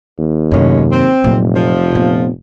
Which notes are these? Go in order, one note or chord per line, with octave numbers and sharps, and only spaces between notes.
D#2
F#2 A2 C3 G#3 C#4
C4
F1 A#2 F#3
F3
A#2 B3